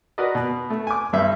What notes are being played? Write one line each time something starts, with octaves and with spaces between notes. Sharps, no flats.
F#4 A#4 B4 D5 D#5
B2
A3
G#5 D6
B1 G2 E5